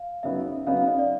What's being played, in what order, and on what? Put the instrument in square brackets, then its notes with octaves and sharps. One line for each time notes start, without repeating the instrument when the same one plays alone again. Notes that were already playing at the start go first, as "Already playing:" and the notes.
Already playing: [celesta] F5
[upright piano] F#2 C#3 F#3 B3 D#4 [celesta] E5
[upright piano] F#2 C#3 F#3 B3 D#4 [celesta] F5
[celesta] F5
D#5
D5